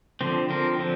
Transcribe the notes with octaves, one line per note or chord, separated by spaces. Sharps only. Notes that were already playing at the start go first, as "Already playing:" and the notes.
D3 F3 C4
D3 F3 C4 A#4
D3 F3 C4